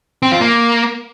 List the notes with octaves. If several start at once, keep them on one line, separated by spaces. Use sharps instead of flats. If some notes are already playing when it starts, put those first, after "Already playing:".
C4
F4
A#3